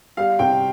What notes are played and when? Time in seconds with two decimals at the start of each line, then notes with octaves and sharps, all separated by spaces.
0.17 G3 F5
0.39 C3 G5